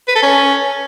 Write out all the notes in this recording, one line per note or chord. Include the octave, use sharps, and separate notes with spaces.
B4
A4
C#4